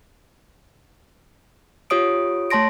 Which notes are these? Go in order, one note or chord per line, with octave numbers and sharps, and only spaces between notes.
F4 G4 C#5 D#6 D7
A3 C#5 A5 C6 A#6 D7